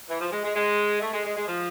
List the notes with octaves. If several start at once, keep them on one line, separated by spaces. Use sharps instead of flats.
E3
F3
G#3
G#3
G#3
A3
G#3
G#3
G#3
F3